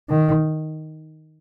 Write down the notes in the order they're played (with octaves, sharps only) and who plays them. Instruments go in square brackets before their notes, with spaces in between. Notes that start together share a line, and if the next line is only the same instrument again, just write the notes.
[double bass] D#3